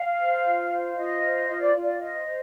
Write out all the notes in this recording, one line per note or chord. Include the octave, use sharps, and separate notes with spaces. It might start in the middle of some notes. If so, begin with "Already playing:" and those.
Already playing: F5
C5
F4
C5
F4 D#5
C5
F4 D#5
D5
F4
D5
C5 D#5
C5